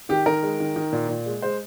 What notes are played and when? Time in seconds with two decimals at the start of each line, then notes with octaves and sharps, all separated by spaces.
0.09 D#3 G4
0.26 D#3 A#4
0.43 G#3
0.60 D#3
0.76 D#3
0.93 A#2
1.09 A#2
1.26 G#3
1.42 G#3 C5